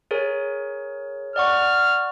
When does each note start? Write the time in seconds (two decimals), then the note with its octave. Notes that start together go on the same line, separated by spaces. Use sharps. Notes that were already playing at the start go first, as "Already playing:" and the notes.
0.11 G#4 A#4 C#5
1.36 D5 F#5 C#6 F6